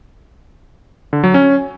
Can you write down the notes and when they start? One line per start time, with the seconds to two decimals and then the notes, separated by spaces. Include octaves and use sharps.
1.13 D3
1.24 F#3
1.34 C#4